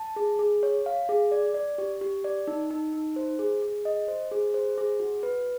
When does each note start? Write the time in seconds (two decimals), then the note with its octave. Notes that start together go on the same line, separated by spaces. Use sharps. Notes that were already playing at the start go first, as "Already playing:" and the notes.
Already playing: A5
0.16 G#4
0.39 G#4
0.63 C#5
0.86 F5
1.09 G#4
1.31 D5
1.54 D5
1.78 G4
2.01 G4
2.24 D5
2.47 D#4
2.70 D#4
2.93 D#4
3.16 C5
3.39 G#4
3.62 G#4
3.85 D#5
4.08 C5
4.31 G#4
4.54 C5
4.78 G#4
5.00 F#4
5.23 B4